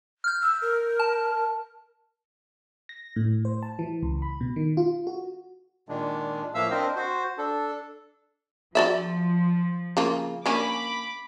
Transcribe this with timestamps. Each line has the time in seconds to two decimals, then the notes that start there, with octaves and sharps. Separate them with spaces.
0.24 F6 G6
0.42 E6
0.62 A#4
1.00 A5
2.89 A#6
3.16 A2
3.45 C5
3.63 A5
3.79 E3
4.03 C#2
4.22 B5
4.41 B2
4.56 D#3
4.77 F4
5.07 F#4
5.89 A#2 D#3 G#3 D4
6.55 A2 F3 A#3 E5 F5 E6
6.71 C4 D4 A#4 C5 D#5
6.96 F#4 C5
7.38 D4 A4
8.75 F3 F#4 D5 E5
9.97 C#3 A#3 F4
10.46 A#3 C#4 D4 B5 D6